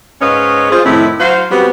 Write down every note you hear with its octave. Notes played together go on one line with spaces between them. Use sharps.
G#2 C#4 B4 C#5 D#5 F5
F4 G#4 C5
F2 A2 D#3 C4 E4
F#3 F#4 C5 F5
G3 B3 C4 F#4 G4